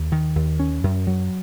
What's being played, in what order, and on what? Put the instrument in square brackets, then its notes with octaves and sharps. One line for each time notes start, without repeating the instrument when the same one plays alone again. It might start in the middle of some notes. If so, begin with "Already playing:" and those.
Already playing: [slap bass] D#2
D#3
D#2
C#4
F#2
F#3